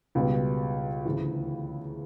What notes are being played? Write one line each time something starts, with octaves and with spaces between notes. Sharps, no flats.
C#2 B2 G3 B3
D2 C#3 E3